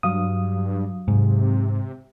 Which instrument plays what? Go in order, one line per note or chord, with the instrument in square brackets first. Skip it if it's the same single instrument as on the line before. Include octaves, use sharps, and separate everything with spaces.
[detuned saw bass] G2 [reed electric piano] F#3 F5 D#6
[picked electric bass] G#2 [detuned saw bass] C3